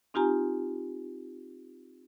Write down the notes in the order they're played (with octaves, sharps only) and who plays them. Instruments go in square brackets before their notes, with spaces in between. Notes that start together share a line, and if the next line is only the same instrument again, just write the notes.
[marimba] C4 D#4 F4 G4 G#5 A#5